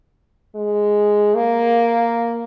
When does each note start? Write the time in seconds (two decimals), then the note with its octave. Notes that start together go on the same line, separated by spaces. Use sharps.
0.55 G#3
1.35 A#3